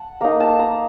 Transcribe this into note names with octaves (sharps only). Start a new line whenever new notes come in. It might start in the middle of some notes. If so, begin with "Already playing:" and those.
Already playing: F#5 A5
A#3 D#4 A#5
A5
A#5